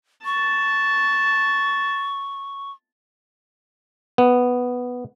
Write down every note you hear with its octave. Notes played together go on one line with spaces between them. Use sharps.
A5 C#6
B3